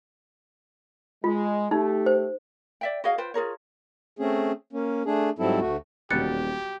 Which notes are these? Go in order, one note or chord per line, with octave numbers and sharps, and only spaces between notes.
G#3 F4
A3 D#4 G4
C5
D5 E5 G5
F#4 G#4 D#5 F5
F4 B4 C5 G5
F4 G#4 A#4 C#5
A3 C4 C#4 G#4
A#3 C#4
A3 D4 G#4
G#2 F#3 G3 C4 E4 A4
D2 A3 F#4
D#1 B2 F#3 G3 G4 F#6 A6 C#7